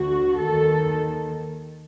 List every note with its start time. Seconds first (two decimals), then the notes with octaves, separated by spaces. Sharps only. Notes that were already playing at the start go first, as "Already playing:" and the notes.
Already playing: D2 D3 F#4
0.40 D#2 D#3 A4